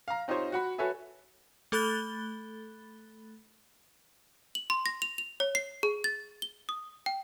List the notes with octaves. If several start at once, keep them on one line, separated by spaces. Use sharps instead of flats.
F5 A#5
C4 D#4 F4 G4 C5 C#5
F#4 F#5 B5
F#4 A4 B4 C#5 E5 G#5
A3 A4 B5 F#6 A6 G7
F#7
C6
A#6
F7
F7
C#5
C7
G#4
A6
G7
D#6
G5